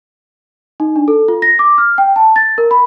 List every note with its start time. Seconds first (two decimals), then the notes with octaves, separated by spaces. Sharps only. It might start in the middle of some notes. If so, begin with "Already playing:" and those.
0.80 D#4
0.96 D4
1.08 A4
1.28 F4
1.42 A#6
1.59 D6
1.78 F6
1.98 G5
2.16 A5
2.36 A6
2.58 A#4
2.71 B5